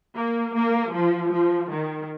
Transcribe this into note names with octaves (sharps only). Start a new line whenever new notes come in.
A#3
A#3
F3
F3
D#3